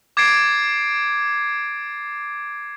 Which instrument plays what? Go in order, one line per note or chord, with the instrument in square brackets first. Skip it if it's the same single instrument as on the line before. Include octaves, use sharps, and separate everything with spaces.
[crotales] D6 G#6 A6 C7 D7